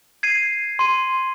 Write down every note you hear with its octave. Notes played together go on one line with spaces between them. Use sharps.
G#6 C7 D#7
C6 D#7